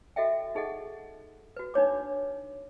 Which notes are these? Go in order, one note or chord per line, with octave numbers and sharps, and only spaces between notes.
F#4 A4 D#5 E5 G5
D#4 G#4 A4 D#5 F#5
F#4 B4
D4 D#4 C#5 D6